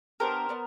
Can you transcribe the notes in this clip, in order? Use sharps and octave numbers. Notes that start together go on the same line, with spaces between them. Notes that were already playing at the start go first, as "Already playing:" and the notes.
B3 D4 G4 A#4 C5
B3 D4